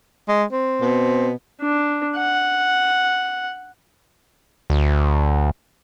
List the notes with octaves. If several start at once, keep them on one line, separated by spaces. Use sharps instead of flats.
G#3
C4
B2
D4
F#5
D2